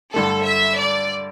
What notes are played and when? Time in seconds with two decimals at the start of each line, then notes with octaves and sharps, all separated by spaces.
0.14 G2 D3 A3 A4
0.45 E5
0.77 D5